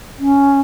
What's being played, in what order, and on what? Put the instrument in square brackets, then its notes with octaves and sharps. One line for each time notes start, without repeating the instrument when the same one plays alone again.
[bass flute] C#4